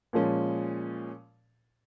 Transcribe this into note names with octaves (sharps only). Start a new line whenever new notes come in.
A#2 F3 G#3 C#4